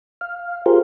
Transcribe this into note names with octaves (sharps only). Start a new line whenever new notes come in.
F5
F4 G4 G#4 A#4 C5